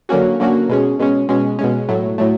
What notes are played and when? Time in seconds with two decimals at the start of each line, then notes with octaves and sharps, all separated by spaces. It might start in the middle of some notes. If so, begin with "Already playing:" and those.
0.09 D3 F#3 A#3 C#4 F#4
0.40 D3 F#3 A#3 C#4 F#4
0.69 B2 G#3 C#4
0.99 B2 G#3 C#4
1.29 B2 G#3 C#4
1.59 B2 G#3 C#4
1.89 A2 F#3 A3
2.18 A2 F#3 A3